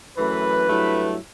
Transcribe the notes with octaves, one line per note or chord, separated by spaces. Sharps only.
F#2 E3 A3 B4
G2 F#3 A3 E4